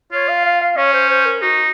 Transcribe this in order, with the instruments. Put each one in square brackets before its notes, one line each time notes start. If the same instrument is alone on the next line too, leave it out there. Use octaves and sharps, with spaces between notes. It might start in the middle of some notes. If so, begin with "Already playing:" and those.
[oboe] F4 [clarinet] C#5
[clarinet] F5
F5
F5
[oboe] C#4 [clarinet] C#5
[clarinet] C5
C5
A#4
[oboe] D#4 [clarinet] F#4